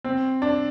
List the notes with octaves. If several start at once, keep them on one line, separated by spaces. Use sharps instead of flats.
C4
D4